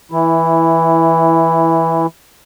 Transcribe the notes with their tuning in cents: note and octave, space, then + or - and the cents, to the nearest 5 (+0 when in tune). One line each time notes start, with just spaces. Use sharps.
E3 -10 E4 +5